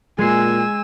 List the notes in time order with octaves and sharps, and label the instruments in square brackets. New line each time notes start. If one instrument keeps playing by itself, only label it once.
[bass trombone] A#2 [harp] G#3 C7 [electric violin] G#5 E6